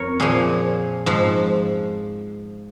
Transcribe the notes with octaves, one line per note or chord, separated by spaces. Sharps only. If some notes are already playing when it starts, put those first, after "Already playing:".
Already playing: F2 A#4 C#5
A#2 F3 G#4
G#2 F3